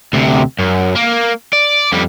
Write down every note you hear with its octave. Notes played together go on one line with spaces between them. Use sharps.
D2 C3
F#2
A#3
D5
F2 G3